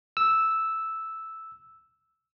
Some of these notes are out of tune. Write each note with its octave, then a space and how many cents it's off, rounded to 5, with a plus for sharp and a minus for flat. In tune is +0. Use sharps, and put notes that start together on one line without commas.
E6 -5